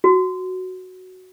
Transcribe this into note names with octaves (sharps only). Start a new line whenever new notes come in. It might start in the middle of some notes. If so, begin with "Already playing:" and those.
F#4